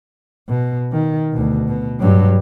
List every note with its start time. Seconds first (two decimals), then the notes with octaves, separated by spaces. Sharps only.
0.49 B2
0.92 D#3
1.33 D2 B2
1.68 B2
2.00 G2 F#3